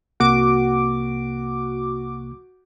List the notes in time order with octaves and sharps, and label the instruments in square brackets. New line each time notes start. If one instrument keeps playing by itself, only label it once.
[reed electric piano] C2 C3 A#3 [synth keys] F#4 D6